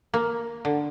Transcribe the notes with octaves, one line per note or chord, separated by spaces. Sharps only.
A#3
D3